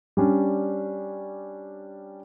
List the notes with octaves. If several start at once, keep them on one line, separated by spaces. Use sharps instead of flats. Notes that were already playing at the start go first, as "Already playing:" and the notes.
G3 C#4 D4